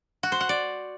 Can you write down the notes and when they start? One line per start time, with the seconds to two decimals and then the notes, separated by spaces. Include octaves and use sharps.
0.23 F#4
0.32 C5
0.41 F#5
0.49 D5